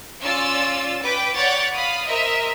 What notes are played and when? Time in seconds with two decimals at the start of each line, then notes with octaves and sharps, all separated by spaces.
0.21 C#4 F4 D5 E6 A6
1.01 B4 G5 D6
1.36 C#5 D5 F#5 B5 G6 A6
1.73 F5 B5 D#6
2.05 A#4 C5 D#5 E5